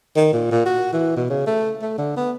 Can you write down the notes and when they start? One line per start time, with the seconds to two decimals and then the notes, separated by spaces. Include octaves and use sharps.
0.16 D#3
0.33 A#2
0.51 A#2
0.66 F#4
0.93 E3
1.17 B2
1.30 C#3
1.46 A3
1.82 A3
1.98 D3
2.17 B3